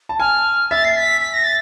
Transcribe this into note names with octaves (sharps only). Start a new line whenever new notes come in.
A5
G#5 F6
E5 A6
C7
B6
B6
A#6
A6